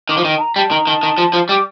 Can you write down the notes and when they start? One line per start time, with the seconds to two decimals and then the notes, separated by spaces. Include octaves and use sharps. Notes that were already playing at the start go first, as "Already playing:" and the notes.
0.09 D#3 D6
0.17 F3
0.24 D#3
0.37 A5
0.40 A#5
0.56 G3 A5
0.71 D#3 A#5
0.87 D#3 A5
1.03 D#3
1.18 F3
1.33 F3
1.49 G3 D6